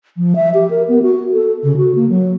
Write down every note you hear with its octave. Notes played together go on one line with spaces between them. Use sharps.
F3
E5
G4
A#4
B3
F#4
A4
C#3
F#4
A#3
F#3